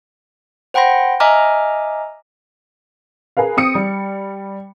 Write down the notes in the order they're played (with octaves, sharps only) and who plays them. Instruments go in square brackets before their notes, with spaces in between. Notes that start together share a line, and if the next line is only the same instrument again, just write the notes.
[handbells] C5 F#5 G5 B5 C6 A#6
D#5 E5 G#5 A#5 D6 F6
[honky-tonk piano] G#4 A#4 B4 F5
C4 D#6 C#7
G3